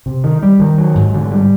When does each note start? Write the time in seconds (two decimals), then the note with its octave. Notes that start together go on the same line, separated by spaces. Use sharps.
0.06 C3
0.24 D#3
0.43 G3
0.60 D#3
0.78 F#3
0.95 G#2
1.14 D3
1.31 G3